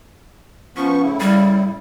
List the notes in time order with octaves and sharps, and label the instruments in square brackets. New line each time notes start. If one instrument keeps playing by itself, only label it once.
[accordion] F3 B3 C#6 [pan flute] C#4
[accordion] A2 C#3 E4
[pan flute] G3